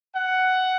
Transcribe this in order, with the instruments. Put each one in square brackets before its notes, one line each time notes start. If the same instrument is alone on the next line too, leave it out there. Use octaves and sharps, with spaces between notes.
[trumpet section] F#5